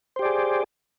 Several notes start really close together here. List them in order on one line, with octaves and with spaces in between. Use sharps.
C5 G4 D5 G#4